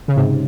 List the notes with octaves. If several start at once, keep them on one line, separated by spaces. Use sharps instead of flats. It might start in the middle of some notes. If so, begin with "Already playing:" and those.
C#3
G#2 C3